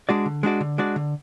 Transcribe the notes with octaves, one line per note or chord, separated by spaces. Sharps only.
G#3 D4 F#4 D5
D3
G#3 D4 F#4 D5
D3
G#3 D4 F#4 D5
D3